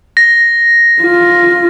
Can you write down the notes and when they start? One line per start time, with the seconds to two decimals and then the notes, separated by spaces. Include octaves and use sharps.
0.17 A#6
1.02 F4